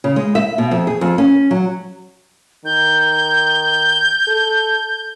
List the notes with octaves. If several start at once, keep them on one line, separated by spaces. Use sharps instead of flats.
C#3
G#3
E5
B2
F2
G#4
F2
C#4
F#3
D#3 G6
A4